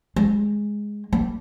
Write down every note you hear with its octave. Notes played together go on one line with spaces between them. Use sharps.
G#3
A#3